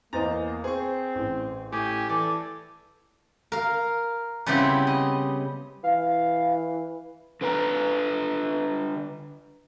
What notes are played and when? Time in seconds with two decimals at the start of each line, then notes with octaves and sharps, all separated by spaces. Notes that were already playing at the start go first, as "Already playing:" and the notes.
0.13 E2 A#3 C5 D#5 A#5 A6
0.64 C4 G#4 C5 C#6
1.15 A1
1.72 A2 G4 G#5
2.09 E3 A4 D5
3.52 A#4 F5
4.46 C#3 G3 B3 C4 E4 G4
4.87 D#5
5.84 E3 F5
7.41 D3 B4 G5 A#5